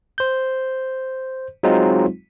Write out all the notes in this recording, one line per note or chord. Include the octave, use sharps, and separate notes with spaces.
C5 G6
F#3 G#3 C4 D#4 F4